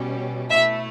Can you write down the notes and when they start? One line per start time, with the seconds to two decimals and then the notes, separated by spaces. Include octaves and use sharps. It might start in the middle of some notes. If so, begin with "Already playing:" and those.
Already playing: B2 G3 C#4 G4
0.50 B2 A3 E4 E5